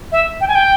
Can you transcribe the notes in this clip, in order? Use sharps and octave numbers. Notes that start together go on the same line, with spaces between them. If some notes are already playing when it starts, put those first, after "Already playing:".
E5
G5
G#5
G5